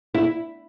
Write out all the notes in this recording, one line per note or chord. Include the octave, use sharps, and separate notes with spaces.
E4